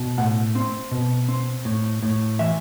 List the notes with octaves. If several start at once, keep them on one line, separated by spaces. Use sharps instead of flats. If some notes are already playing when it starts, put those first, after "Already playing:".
Already playing: B2
A2 F#5
C4
B2
C4
A2
A2
E3 E5